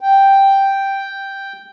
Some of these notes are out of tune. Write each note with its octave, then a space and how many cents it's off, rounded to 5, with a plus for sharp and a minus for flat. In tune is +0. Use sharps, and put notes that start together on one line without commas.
G5 +0